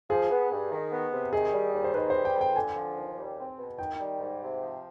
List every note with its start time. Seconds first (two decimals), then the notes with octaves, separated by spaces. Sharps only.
0.10 F3 G#4
0.31 B3
0.51 G2
0.71 D#3
0.92 B3
1.12 C3
1.33 D#3 G#4
1.53 G3
1.73 D#2
1.84 C5
1.94 D#3 B4
2.10 G3 C5
2.25 G5
2.36 F2
2.41 G5
2.56 D3 G#5
2.76 F3
2.97 D#2
3.18 G3
3.38 C4
3.58 B2
3.79 D#3 G5
3.99 G3
4.20 G#2
4.41 C3
4.61 F3